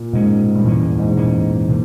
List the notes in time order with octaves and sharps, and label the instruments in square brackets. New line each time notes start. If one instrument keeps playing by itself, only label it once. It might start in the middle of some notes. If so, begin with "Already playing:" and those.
Already playing: [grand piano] A#2
[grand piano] G#2 [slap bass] B2 G#3 C#4
[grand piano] G2
[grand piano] E2 [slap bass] A#2 A#3 C#4
[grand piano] G#2
[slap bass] A#2 A#3 C#4
B2 A#3